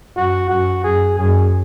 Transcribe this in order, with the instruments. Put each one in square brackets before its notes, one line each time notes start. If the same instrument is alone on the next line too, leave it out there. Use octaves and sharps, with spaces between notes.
[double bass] F#2 [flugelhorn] F#4
[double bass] F#2 [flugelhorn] F#4
[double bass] F#2 [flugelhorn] G#4
[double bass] F#2 [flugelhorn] G#4